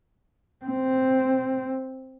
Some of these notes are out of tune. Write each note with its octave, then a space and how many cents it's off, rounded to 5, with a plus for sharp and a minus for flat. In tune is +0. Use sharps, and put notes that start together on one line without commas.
C4 +0